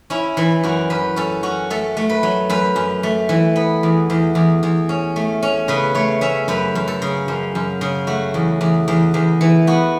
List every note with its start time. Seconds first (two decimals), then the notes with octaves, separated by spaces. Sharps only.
0.10 C#4 E4
0.37 E3 E4
0.63 F#2 F#4
0.90 F#2 B4
1.16 C#4 A4
1.43 C#4 F#4
1.70 A3 A4
1.97 A3
2.09 B4
2.23 F#3
2.49 F#2 B4
2.76 F#2
3.03 A3
3.29 E3
3.56 B3
3.83 E2
4.10 E2
4.35 E2
4.63 E2
4.89 C#4
5.16 A3
5.42 C#4
5.68 C#3 B4
5.95 A3 C#5
6.21 C#4 E5
6.48 F#2 B4
6.75 F#2
6.88 A4
7.02 C#3
7.28 F#2
7.55 F#2
7.81 C#3
8.07 A3 F#4
8.34 E2
8.61 E2
8.88 E2
9.14 E2
9.41 E3
9.67 B3 F#4